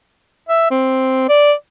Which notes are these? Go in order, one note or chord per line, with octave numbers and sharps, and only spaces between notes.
E5
C4
D5